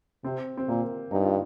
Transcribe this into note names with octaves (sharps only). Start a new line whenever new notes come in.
C3 C4
C4
A#2 A#3
G2 D#4
F4